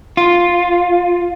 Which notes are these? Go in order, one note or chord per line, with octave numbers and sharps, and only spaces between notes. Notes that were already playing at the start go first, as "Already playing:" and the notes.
F4